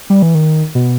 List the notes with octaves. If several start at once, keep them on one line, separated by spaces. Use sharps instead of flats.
G3
E3
D#3
B2